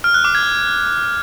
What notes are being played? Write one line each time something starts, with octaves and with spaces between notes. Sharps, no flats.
F6
F#6
D6
G#6